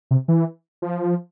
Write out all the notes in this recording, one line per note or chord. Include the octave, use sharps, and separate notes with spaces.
C3
E3
F3